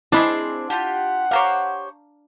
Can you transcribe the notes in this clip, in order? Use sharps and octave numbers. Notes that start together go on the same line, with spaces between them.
C4 D4 E4 G4 G#4 D#5 B5
F4 G4 F#5 A5
G4 C5 C#5 F5 A#5 D6